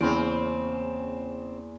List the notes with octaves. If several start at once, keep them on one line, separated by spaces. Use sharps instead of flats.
E2 C#3 A#3 C4 C6 D7